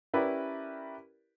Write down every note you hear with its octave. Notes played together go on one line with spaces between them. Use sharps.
C#4 E4 G4 A#4 B4 D5